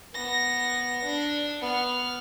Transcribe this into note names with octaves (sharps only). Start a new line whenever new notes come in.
B3 A#6
D4
B3 F6